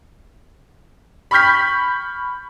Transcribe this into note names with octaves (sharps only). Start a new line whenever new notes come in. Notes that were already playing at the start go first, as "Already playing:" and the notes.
B5 C#6 F6 G6 B6